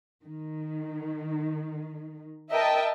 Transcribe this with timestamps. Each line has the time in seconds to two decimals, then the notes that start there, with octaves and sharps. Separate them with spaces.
0.25 D#3
2.50 A#4 D#5 E5 G5 A5